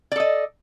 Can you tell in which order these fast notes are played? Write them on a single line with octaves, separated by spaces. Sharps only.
D5 A4 D#5